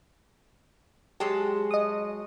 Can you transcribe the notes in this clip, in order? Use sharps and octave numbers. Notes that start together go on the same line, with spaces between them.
F#3 G#3 G4 A5
D#5 D#6